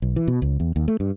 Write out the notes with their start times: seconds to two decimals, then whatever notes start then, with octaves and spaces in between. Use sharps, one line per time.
0.02 B1
0.16 E3
0.28 B2
0.42 C#2
0.60 E2
0.76 D#2
0.88 A3
1.00 G2